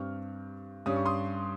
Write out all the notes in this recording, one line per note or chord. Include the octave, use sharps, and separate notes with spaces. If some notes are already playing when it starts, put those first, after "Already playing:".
Already playing: G2 G3 C4 C#6 F6
G2 G3 C#4 D#6
C#6
C6 D#6